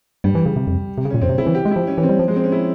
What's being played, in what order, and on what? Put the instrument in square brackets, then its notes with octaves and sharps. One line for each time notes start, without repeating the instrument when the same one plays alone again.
[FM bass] G2 [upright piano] G3
[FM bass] E3
C#3
C3
F2
C3
C#3
[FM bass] A#2 [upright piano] C#4
[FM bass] F2 [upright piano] C4
[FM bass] C3
[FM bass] C#3 [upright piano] E4
[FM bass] E3
[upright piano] G4
[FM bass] G#3
[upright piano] E4
[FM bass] F3
[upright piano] C#4
[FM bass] E3 [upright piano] C#4
[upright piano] C4
[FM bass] G3
F3
[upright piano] G#3
C4
C#4
E4